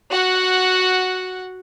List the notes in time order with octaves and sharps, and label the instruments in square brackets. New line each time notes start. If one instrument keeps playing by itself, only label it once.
[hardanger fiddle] F#4 F#5